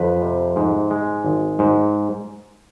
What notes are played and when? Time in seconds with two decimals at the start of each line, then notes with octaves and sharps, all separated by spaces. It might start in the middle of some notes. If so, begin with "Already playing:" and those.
Already playing: F2 B4
0.22 C3
0.56 G#2
0.91 G#3
1.25 G#1
1.59 G#2